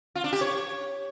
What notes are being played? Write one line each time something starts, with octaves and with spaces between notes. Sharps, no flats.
F4
D4
G4
C#5